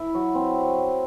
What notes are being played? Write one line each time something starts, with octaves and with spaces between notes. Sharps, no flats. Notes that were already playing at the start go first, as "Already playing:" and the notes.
Already playing: E4
F#3
C4